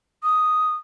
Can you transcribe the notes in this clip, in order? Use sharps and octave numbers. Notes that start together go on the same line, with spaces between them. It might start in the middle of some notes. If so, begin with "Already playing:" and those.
D#6